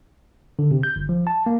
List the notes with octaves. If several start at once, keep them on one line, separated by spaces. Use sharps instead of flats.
D3
C3
G6
G1
F3
A5
A#3